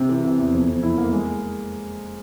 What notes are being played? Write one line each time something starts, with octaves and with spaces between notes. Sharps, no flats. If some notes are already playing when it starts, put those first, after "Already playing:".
Already playing: C3 C4
E3
C3
E2
F2
F2
E4
A#3
G#3